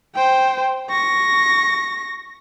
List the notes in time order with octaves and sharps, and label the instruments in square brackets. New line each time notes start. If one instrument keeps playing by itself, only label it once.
[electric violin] C5 G5
C#6 A#6